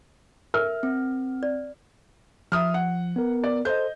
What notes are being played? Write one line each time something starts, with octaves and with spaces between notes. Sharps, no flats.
A#4 E5 F6
C4
D5
F3 E5 D#6 F6
F#5
B3 A#4
D5
A4 C5 D#5 G6